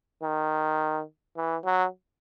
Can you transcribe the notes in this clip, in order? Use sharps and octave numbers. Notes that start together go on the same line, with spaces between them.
D#3
E3
F#3